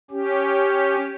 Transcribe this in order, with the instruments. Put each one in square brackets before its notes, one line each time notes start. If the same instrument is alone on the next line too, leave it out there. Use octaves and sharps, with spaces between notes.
[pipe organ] C#4 G4